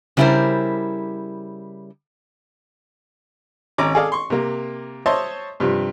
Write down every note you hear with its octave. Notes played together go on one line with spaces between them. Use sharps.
C#3 G3 E4 F4 A#4 C5
G#1 C#4 A#5 D6
G#4 A4 D5 F5
C6 C#6
C3 A#3
C5 C#5 D#5 E5 A5 C6
G2 C3 F3